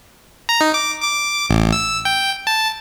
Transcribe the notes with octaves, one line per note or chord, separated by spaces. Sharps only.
A#5
D#4
D6
D6
A1
E6
G5
A5